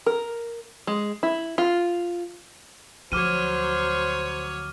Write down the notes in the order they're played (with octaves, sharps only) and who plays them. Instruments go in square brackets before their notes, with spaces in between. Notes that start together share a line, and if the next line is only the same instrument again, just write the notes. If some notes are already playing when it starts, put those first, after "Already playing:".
[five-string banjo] A#4
G#3
E4
F4
[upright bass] D2 F3 [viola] F#3 C#5 [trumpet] C5 [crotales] D6 F6 D#7